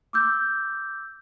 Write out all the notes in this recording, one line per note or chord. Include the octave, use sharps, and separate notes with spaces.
D6 E6 G6